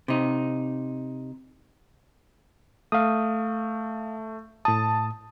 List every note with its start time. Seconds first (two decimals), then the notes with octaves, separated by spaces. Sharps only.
0.08 C3 D#4
2.92 A3 F5 D#6
4.65 A2 A5 D#6